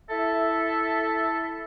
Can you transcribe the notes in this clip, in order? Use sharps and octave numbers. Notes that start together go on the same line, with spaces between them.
E4 A4 E5